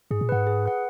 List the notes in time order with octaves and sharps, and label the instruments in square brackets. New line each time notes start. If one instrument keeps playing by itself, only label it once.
[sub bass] G#2 [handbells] G#4
[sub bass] A#2
[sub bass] G#2 [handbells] B4 F#5
[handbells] G#4
B4 F#5